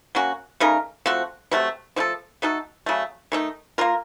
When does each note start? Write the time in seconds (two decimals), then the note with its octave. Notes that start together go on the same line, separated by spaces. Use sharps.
0.15 F#3 A#3 C#4 F#4
0.60 C#3 A3 D#4 A#4
1.06 F3 A3 C4 F#4
1.51 C3 F#3 A3
1.96 F3 A3 D#4 A4
2.42 A3 D#4 F#4 A4
2.86 C#3 F#3 A3
3.32 D#3 A3 D#4
3.78 A#3 F4 A#4